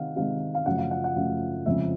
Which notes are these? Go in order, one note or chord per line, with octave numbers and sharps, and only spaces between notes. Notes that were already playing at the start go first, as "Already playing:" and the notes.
Already playing: C3 D#3 F5 F#5
C3 D#3 G#3 F5
F5
F#2 C#3 F3 A3 F#5
F5
F#5
F#5
F#2 C#3 F3 A3 F5
F2 C#3 F3 G#3 E5